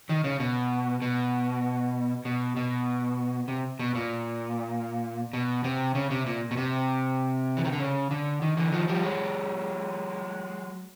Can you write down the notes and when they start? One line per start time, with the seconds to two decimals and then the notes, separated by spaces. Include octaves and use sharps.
0.09 D#3
0.24 C#3
0.40 B2
1.02 B2
2.25 B2
2.57 B2
3.48 C3
3.79 B2
3.95 A#2
5.33 B2
5.64 C3
5.95 C#3
6.10 C3
6.26 A#2
6.51 B2
6.57 C3
7.57 E3
7.65 D#3
7.72 D3
7.80 C#3
8.11 D3
8.42 D#3
8.57 D3 E3
8.72 D#3 F3
8.88 F3 G3
9.03 F#3 G#3